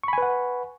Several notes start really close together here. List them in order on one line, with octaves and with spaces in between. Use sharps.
C#6 B5 G#5 B4 F#5